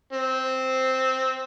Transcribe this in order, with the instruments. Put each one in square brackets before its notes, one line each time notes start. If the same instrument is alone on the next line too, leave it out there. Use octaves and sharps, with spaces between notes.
[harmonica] C4